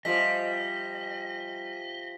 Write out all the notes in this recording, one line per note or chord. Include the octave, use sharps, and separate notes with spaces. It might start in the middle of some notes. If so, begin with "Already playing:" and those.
F3 G3 D#5 E5 G#5 B6